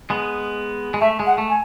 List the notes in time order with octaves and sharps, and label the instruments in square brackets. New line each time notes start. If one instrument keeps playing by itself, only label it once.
[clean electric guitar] G#3 B3
G#3
[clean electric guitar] A3 [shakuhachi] E5
[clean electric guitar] G#3
[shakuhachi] F#5
[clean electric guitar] A3
[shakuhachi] G#5